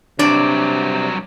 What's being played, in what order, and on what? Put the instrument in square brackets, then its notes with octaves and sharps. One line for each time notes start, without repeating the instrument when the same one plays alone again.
[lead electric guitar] G2 F#3 [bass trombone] C3 [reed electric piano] D4 [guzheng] D5